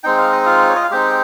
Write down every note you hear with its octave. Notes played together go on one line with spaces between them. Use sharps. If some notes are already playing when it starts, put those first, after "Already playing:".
G#3 C4 D#4 G5
F5
D#5
F4 F5
C#5
D#5
F5
G#3 C4 D#4 G4 G5